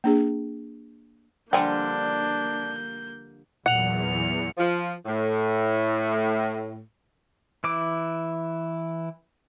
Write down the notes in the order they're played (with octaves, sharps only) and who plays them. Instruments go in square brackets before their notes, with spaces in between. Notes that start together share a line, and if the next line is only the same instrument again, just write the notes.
[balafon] A#3 D4 G#4
[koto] D3 F3 G3 [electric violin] A#3 G6 [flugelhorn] D4 [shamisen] G5 G#5
[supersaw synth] E2 [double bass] A#2 F#3 [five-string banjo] F#5 [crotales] C#7 F7
[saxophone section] F3
A2
[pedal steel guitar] E3 E4 D6